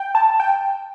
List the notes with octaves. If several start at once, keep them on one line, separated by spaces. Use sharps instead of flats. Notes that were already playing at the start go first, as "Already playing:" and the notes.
Already playing: G5
A5
G5